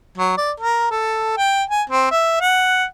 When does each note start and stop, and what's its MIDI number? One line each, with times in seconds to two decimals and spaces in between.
0.17 0.32 54
0.37 0.52 74
0.60 0.88 70
0.91 1.33 69
1.37 1.63 79
1.69 1.82 80
1.89 2.06 60
2.11 2.37 76
2.41 2.84 78